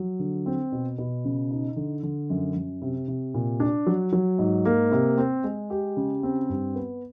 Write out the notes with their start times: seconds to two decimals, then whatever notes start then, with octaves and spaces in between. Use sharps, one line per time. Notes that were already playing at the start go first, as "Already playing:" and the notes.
Already playing: F#3
0.19 D3
0.46 C4
0.72 B2
0.98 B2
1.25 C#3
1.51 D#4
1.76 D3
2.03 D3
2.30 F#2
2.55 F#2
2.82 C3
3.08 C3
3.34 A#2
3.60 D4
3.87 F#3
4.12 F#3
4.39 G#2
4.65 A#3
4.92 C3
5.18 C4
5.44 G#3
5.70 G4
5.97 C#3
6.23 C4
6.49 G2
6.75 B3